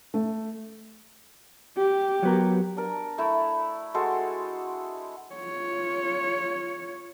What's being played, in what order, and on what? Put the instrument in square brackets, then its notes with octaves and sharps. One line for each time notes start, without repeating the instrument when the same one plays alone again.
[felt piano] A3
[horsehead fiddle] G4
[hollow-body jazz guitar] F#3 B3 A#4
[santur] D4 A#4
A3 E4
G#3 F#4 A4 C5
[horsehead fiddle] F4 C#5